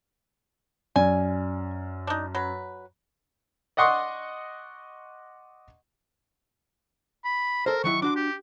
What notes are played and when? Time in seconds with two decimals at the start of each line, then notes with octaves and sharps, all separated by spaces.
0.96 F#2 D5 G#5
2.07 D4 D#4
2.35 F#3 B4
3.77 D5 D#5 F#5 C6 C#6 D#6
7.25 B5
7.66 A4 A#4 C5
7.84 D#3 F#3 E4 C#6
8.02 D4 F#4 C6 D6
8.16 G4